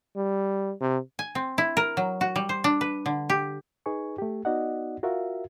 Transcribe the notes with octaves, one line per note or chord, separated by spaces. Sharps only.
G3
C3
G#5
C4
E4
A#4
F#3
F#4
G3
C5
D4
B4
D3
G4
D#4 G#4 B4 G#5 C#6
A3 G4
B3 D#4 F#4 D5 D#5 F#5
F4 F#4 A#4 E5 F5